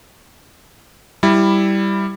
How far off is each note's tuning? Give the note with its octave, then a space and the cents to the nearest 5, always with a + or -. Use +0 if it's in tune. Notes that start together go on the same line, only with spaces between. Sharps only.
G3 +0 E4 +0